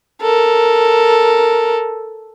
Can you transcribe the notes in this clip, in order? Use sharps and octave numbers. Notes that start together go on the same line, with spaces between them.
A4 A#4